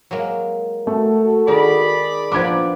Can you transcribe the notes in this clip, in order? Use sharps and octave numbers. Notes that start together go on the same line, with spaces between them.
F#3 G#3 A#3
A3 F#4 A4
D#3 G#4 D5 B5
A#2 F3 B3 D4 D6 G#6